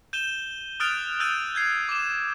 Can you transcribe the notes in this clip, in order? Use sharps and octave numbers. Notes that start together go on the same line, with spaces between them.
G6 D#7 E7 G7
D#6 F6 F#6 A6 D7 F7
E6 F6 G6 A6 D#7
G6 G#6 C7
D6 E7